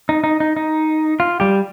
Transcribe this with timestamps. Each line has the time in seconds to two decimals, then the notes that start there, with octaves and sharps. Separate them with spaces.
0.09 D#4
0.24 D#4
0.40 D#4
0.57 D#4
1.20 F4
1.40 G3 G4